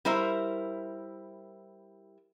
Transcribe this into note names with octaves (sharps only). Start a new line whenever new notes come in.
G3 E4 A#4 C5 E5